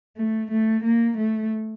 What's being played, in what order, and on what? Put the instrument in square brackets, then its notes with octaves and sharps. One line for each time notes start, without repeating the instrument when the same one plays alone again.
[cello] A3
A3
A#3
A3